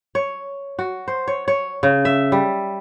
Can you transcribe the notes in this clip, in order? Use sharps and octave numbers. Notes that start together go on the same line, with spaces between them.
C#5
F#4
C5
C#5
C#5
C#3
E5
G3